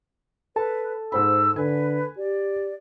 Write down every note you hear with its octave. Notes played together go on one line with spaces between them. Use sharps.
A4 B4 A5
G#2 C5 B5 E6
D3 B4 G#5
G4 D5